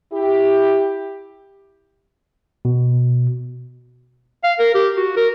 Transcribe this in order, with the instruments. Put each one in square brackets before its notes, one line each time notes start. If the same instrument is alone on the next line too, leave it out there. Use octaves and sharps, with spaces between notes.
[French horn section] E4 G4
[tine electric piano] B2
[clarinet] F5
A#4
G4
F#4
A#4